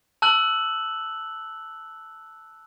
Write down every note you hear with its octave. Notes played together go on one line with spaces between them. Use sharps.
A5 E6 F#6 F#7